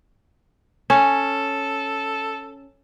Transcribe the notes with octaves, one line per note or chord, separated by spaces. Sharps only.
C#4 A4